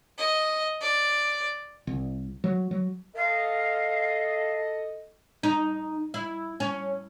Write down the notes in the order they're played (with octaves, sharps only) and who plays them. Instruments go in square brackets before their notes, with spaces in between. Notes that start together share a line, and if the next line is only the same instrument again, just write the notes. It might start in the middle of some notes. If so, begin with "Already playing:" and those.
[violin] D#5
D5
[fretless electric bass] C2
F#3
F#3
[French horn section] A4 D#5 [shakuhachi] F5
[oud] D#4
E4
C#4